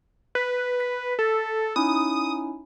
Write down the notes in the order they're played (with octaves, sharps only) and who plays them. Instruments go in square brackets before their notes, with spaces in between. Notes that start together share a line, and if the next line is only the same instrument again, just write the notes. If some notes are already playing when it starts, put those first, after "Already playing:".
[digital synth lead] B4
[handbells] B6
[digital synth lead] A4
[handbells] C#4 D#4 E4 [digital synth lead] D#6